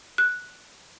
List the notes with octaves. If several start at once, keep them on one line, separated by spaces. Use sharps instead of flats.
F#6